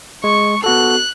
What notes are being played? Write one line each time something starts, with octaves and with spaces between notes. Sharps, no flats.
G#3 C#6
B3 F#4 A4 F#6